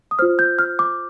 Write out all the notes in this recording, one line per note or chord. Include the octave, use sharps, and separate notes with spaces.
D#6
F4 C5 F6
G6
F6
D6